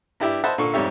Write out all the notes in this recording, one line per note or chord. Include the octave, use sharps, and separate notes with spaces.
G2 E4 G4 D5 E5
C5 D#5 E5 F#5 A5 B5
A#2 D3 A4 C#6
F2 G#2 G3 G4 C#5 E5